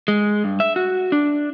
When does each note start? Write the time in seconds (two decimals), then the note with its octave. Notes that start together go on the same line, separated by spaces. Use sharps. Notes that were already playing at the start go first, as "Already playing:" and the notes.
0.08 G#3
0.44 G2
0.60 E5
0.76 F#4
1.12 D4